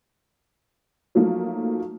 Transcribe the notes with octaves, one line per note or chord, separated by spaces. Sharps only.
F3 F#3 A3 A#3 D#4